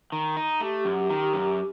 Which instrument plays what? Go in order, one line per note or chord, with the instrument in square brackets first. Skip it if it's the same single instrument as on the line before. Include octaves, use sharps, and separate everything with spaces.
[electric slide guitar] D#3
D#4
[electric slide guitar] A3 [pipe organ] G4
[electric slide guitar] F#2
D#3
F#2